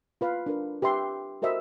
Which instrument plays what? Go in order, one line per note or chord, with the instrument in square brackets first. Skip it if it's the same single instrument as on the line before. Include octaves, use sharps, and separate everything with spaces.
[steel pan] F4 B4 F5
D4 A#4 B4
G4 B4 E5 C6
F#4 A#4 C5 D#5 E5